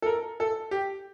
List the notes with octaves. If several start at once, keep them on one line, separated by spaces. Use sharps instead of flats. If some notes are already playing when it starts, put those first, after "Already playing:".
A4
A#4
A4
G4